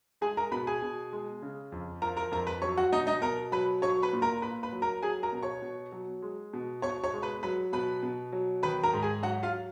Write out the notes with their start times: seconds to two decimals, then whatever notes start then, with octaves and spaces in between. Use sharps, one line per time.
0.21 G#3 G#4 G#5
0.37 A#4 A#5
0.52 B2 B4 B5
0.67 G#4 G#5
0.82 B2
1.13 G#3
1.42 C#3
1.72 F2
2.02 F3 A#4 A#5
2.17 A#4 A#5
2.32 F2 A#4 A#5
2.47 B4 B5
2.62 F#3 C#5 C#6
2.77 F#4 F#5
2.92 B2 D#4 D#5
3.07 D#4 D#5
3.22 B2 A#4 A#5
3.52 F#3 B4 B5
3.82 F#3 C#5 C#6
4.02 B4 B5
4.13 A#2
4.22 A#4 A#5
4.42 A#2 B4 B5
4.63 B4 B5
4.72 F#3
4.82 A#4 A#5
5.03 F#3 G#4 G#5
5.23 A#4 A#5
5.33 B2
5.43 C#5 C#6
5.62 B2
5.92 F#3
6.22 G#3
6.53 B2
6.82 B2 C#5 C#6
7.04 C#5 C#6
7.13 G#3
7.22 B4 B5
7.43 F#3 B4 B5
7.73 B2 B4 B5
8.03 B2
8.32 F#3
8.63 D#3 B4 B5
8.83 A#4 A#5
8.93 G#2
9.03 G#4 G#5
9.23 F#3 F#4 F#5
9.43 F4 F5